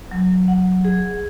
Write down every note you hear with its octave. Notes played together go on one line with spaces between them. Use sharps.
F#3
F#5
G#4